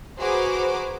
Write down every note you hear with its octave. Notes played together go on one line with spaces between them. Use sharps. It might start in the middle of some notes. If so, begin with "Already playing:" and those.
F#4 G#4 B4 C5 A#5 D6